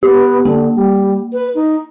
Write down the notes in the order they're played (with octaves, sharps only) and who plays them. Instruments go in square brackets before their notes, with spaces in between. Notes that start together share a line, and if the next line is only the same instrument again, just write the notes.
[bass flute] B3 [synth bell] G4
[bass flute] D3 [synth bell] A#3
[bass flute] G3
B4
D#4